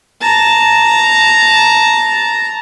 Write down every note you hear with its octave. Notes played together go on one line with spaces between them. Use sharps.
A5 A#5